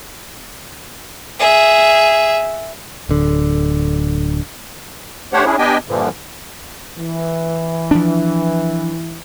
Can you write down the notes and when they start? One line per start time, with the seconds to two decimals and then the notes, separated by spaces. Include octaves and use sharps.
1.39 G#4 E5
3.09 D1 D3
5.33 A3 D4 G4 C5 C#5 F#5
5.45 C#4 D4 E4 G#4
5.58 B3 D4 G4 D#5 G5 G#5
5.88 G2 A#2 D3 E3 F3
6.97 E3
7.91 F3 D4